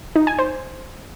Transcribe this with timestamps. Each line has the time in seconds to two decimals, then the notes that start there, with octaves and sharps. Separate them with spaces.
0.16 D#4
0.27 G#5
0.39 C5